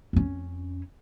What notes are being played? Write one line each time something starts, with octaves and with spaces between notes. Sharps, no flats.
F2 C#4